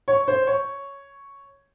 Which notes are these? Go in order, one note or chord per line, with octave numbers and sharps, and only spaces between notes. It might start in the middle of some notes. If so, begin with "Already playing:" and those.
C#5
C5
C#5